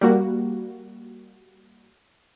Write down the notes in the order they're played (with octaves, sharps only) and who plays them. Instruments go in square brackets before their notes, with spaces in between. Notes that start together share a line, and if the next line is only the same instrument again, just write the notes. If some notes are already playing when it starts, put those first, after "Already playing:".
[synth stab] G3 A#3 F#4